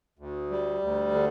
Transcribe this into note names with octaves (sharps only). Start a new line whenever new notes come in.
D2
G3
D2
D3